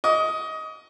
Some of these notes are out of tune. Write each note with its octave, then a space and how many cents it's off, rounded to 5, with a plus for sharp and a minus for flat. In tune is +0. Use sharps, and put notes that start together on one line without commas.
D#5 +15 D6 -40